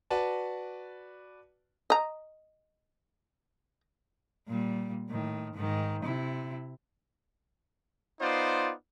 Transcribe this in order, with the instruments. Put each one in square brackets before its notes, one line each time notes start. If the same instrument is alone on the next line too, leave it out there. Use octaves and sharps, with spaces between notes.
[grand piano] F#4 B4 D5 A5
[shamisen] D#5 A#5
[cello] A#2 G3
A2 D#3
G#2 D#3
C3 E4
[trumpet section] B3 D#4 F4 C5 D5